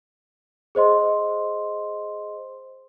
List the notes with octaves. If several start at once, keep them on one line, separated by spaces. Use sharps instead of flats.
G#4 C5 D#5 C6